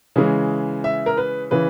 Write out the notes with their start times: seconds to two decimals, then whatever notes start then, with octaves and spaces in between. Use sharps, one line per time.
0.16 C#3 E3 G#3
0.84 E5
1.06 A#4
1.17 B4
1.51 C#3 E3 B4